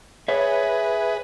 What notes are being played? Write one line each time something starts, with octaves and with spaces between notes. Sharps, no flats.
G#4 B4 C#5 E5